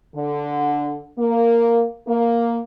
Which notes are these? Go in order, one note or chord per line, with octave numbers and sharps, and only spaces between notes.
D3
A#3
A#3